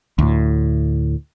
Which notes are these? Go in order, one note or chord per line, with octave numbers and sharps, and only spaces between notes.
D2 A2